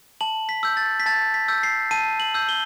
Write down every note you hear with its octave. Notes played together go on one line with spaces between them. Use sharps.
A5 F#7
B6
E6 G6
A6
B6
A5 A6
B6
E6 G6
C7
A5 D#7
F#7
E6 G6
G7